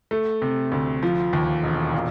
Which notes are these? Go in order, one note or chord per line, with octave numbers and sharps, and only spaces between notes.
A3
C3
D2
F3
D#2
E1
A#2